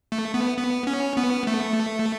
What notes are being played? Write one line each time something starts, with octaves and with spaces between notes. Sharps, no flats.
A3
B3
B3
C#4
B3
A3